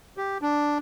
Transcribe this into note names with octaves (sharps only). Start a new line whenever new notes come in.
G4
D4